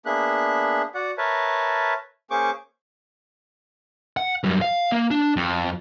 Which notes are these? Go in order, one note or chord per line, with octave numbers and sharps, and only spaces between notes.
A#3 B3 D4 G#4 E5 F#6
F#4 D5 F#5
A#4 B4 C#5 E5 A5
A#3 C#4 G#4 C5 C#6 D6
F#5
F#2 G3
F5
A#3
D4
F2